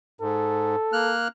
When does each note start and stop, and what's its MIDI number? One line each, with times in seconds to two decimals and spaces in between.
0.21 0.76 44
0.21 1.13 69
0.93 1.28 58
0.93 1.28 89
0.93 1.28 90